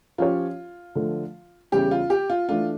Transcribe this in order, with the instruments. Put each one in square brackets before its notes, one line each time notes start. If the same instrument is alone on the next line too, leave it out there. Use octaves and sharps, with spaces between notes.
[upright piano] F3 C#4 G4 C#5 [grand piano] F4
[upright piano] D3 F3 A3
[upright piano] E2 C#3 G3 C#4 E4 [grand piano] G4
[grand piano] F4
G4
F4
[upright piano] E3 A3 D4 [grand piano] F4